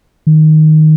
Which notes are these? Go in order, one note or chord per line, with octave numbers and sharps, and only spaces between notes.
D#3